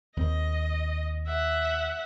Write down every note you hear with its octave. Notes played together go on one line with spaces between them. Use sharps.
D#2 C4 D#5
E5 F#5